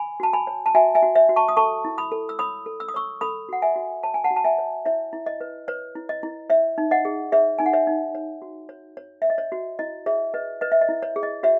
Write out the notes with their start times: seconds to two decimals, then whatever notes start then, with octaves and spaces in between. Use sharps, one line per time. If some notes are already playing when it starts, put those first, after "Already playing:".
Already playing: G#5 B5
0.20 F#4 A5
0.33 G#5 B5
0.47 C#5
0.66 A5
0.75 F#4 E5 G#5
0.95 E5 G#5
1.02 F#4
1.15 C#5 E5
1.29 F#4
1.36 A5 C#6
1.48 D#6
1.57 A4 A5 C#6
1.85 E4
1.98 B5 D#6
2.12 A4
2.29 E6
2.39 C#5 B5 D#6
2.66 A4
2.80 E6
2.88 D#6
2.94 C#5 C#6 E6
3.21 A4 B5 D#6
3.49 F#4 F#5
3.62 E5 G#5
3.76 F#4
4.03 C#5 A5
4.14 G#5
4.24 F#5 A5
4.30 F#4
4.36 A5
4.44 E5 G#5
4.58 C#5
4.85 E4 C#5 E5
5.13 E4
5.26 D#5
5.41 B4
5.68 B4 C#5
5.96 E4
6.09 D#5
6.23 E4
6.50 C#5 E5
6.78 D#4
6.91 D#5 F#5
7.05 G#4
7.32 G#4 C#5 E5
7.58 D#4 G#5
7.66 F#5
7.73 C#5 E5
7.87 D#4
8.15 C#5
8.42 F#4
8.69 C#5
8.97 C#5
9.22 C#5 E5
9.30 D#5
9.38 C#5
9.52 F#4
9.79 E4 D#5
10.06 G#4 C#5 E5
10.34 B4 D#5
10.61 B4 D#5
10.72 E5
10.81 D#5
10.89 E4
11.03 C#5
11.16 G#4
11.23 D#5
11.43 F#4 C#5 E5